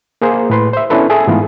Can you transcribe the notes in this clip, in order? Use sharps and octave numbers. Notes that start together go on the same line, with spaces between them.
A#3 G#4 C5
A2 B4 C6
C5 E5
B3 C#4 D4 E4 A4 B4
G#4 A4 E5 G#5
G#2 E3 A3 B3 F4